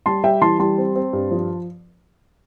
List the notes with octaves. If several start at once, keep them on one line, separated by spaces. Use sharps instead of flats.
G3 A5 C6
G3 E5 G5
E3 A5 C6
G3 A5 C6
C4
C4
G2
F3